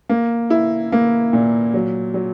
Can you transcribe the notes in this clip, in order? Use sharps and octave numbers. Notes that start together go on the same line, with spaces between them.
A#3
E4
A#3
A#2
F#3
F#3